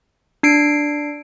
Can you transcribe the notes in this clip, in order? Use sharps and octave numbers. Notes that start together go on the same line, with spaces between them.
D4 C7 D7